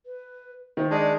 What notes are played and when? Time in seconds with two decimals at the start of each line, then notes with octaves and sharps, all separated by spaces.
0.06 B4
0.77 D#3 C5
0.91 G#3 D4 D5